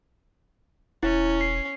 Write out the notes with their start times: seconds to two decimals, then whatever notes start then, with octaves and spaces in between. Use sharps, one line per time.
1.03 E1 C#4 E4
1.41 C7